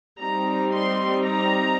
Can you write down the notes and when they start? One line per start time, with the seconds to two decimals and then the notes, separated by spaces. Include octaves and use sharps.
0.20 G3 C4 D#4 A#5
0.73 C6
1.25 A#5